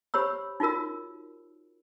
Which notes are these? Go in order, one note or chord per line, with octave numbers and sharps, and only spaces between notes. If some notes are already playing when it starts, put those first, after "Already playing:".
G4 C5 C#5 B5 E6
D#4 F4 F#4 A#4 E6